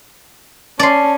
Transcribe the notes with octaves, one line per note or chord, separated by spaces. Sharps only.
C#4 D5 A5 C6